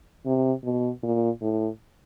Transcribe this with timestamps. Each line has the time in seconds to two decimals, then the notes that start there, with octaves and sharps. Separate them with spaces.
0.26 C3
0.64 B2
1.03 A#2
1.42 A2